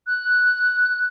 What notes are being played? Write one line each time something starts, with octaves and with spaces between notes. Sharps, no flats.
F#6